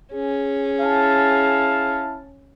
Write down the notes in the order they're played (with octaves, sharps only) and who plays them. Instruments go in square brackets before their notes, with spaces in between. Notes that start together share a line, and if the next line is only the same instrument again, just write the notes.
[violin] C#4 [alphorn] G#4
[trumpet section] E4 F5 A5